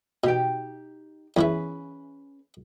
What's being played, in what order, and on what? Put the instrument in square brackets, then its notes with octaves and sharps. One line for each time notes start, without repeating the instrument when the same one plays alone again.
[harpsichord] B2 [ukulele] D#4 G4 G5
[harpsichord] E2 E3 E4 [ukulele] C#4 G#4 B4